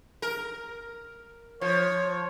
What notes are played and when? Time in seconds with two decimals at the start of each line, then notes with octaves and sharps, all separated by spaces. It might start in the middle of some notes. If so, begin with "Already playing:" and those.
0.22 A#4
1.61 F3 C#5